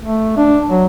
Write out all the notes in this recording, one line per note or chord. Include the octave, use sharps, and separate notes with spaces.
A3
D4
F#3